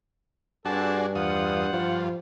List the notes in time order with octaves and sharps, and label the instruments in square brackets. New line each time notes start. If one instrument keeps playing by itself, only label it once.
[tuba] G2 [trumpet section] C4 A4 A5 [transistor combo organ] D4 F#4 G#4
[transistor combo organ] E2 F4 D#6 [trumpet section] C5 F#5
[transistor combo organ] G2 F4 [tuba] F3